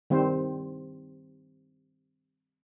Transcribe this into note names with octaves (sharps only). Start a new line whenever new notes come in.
D#3 G3 C4 C5